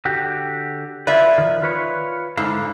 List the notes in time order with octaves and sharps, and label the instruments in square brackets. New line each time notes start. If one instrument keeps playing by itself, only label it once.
[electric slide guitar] D3 F#4 G4
[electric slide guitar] E4 F4 B4 [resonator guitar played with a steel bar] D5 E5
[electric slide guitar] D#3 F3
F4 B4 C#5
[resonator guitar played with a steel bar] G#2 [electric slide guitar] D3 E4 F5